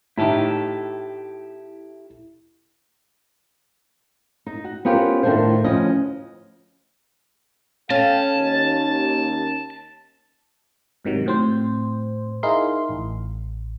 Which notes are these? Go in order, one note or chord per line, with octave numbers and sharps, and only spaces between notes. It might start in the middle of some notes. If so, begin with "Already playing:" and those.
A2 D#4 E4 G4 A4
D#4
F#4
B3 C#4 F4 G4 A#4 C5
A2 D#3 A3 D4 F4 C5
D2 F3 C#4 B4 D#5
C#4 A4 F5 G5 A5
D#2
G#2 C3 D#3 F#3
A2 C4 C5
D#4 E4 G#4 A#4 F5 C6
A1